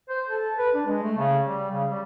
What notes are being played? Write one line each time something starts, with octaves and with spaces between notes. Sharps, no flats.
C5
A4
B4
D4
G#3
A3
C#3
G3
C#3
G3